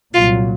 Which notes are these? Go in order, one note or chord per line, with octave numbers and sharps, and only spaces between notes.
C2 A#2 F#3 F4